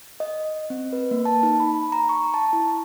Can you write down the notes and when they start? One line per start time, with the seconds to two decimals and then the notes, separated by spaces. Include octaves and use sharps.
0.20 D#5
0.70 C4
0.93 B4
1.11 A#3
1.25 A5
1.43 D#4
1.60 B5
1.92 A#5
2.09 C#6
2.34 A5
2.53 E4